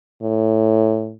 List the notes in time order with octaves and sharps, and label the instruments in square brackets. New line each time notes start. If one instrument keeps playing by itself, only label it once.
[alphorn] A2